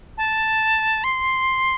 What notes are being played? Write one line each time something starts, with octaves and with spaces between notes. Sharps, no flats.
A5
C6